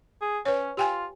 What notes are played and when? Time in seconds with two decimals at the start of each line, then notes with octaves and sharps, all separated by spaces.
0.21 G#4
0.45 C#4 B4 C#5
0.77 F4 G4 G5 G#5